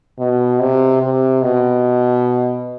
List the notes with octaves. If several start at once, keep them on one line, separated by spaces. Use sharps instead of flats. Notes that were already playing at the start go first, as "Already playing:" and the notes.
B2
C3
C3
B2